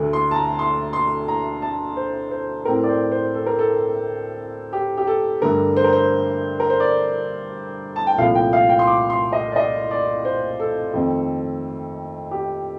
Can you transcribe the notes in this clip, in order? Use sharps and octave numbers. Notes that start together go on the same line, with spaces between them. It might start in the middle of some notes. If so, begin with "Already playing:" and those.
Already playing: D2 D3 A3
C6
A5
A#5
C6
C6
A#5
A5
C5
C5
A2 A3 C4 A#4
D5
C5
C5
A4
A#4
A4
G4
G4
A4
G2 D3 A3 A#4
C5
A#4
C5
A#4
C5
D5
A5
G5
C2 A#2 F3 A3 F5
G5
F5
G5
C6
D6
C6
D#5
D5
D#5
D5
C5
A4
F2 D#3 A3 C4
G4